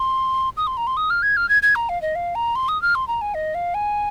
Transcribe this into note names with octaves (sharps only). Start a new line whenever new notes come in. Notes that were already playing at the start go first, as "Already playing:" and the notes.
Already playing: C6
D#6
C6
A#5
C6
D#6
F6
G#6
F6
G#6
G#6
A#5
F5
D#5
F5
A#5
C6
D#6
F6
C6
A#5
G#5
D#5
F5
G#5